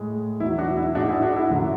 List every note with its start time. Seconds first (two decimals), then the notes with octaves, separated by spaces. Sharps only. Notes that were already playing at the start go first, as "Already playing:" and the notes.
Already playing: A2 G#3
0.40 E2 B2 F#3 E4
0.58 D4 F#4
0.77 E4
0.95 G#2 G#3 D4 F#4
1.09 E4 G#4
1.22 D4 F#4
1.36 E4
1.50 F#2 D3 F#3